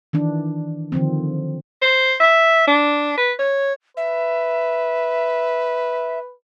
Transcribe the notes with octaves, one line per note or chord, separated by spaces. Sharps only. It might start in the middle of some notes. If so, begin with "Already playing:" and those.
D#3 E3 D4
D3 D#3 F3 C4
C5
E5
D4
B4
C#5
B4 E5